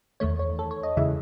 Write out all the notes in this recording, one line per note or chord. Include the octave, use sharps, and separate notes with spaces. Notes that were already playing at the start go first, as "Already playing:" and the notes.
E2 D#3 A3 C#5
C#5
A4
C#5
D#5
E2 C#3 E3 G#3 E5